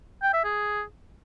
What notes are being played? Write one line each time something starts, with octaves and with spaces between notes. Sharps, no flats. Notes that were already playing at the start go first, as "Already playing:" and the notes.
G5
E5
G#4